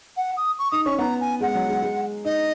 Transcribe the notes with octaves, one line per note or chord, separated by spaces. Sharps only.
F#5
D#6
C#6
D#4 D#6
C#4 C#6
B3 A#5
G#5
G#3 F#5
F#3
G#3
G#3
D#4 D#5